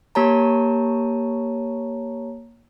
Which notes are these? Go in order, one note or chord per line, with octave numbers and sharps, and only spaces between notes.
A#3 G4 C#5 A5 A#5